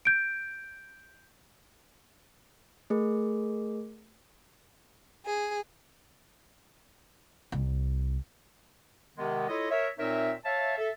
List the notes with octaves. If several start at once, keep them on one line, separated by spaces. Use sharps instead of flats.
G6 D7
A3 G#4 A#4
G#4
C2
C3 D#3 G#3 B3
E4 F4 A4 C#5 D#5
A#4 C#5 E5
A#2 C4 D#4 A#4 C#5 E5
C#5 E5 F5 A5
A4 E5